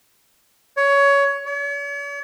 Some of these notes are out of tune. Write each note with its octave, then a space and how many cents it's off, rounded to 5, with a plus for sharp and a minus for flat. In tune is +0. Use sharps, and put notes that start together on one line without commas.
C#5 +20
C#5 +45